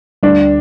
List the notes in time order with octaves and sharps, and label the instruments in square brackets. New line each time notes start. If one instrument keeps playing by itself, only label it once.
[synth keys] D2 D3 G3 [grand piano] D4